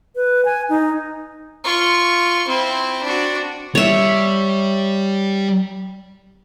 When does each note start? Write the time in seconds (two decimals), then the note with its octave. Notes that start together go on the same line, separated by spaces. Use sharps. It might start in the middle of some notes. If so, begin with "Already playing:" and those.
0.16 B4
0.45 G#5
0.69 D#4
1.64 F4 C#6
2.48 C4 E4
3.03 D4 F#4
3.75 G3 C#5 E5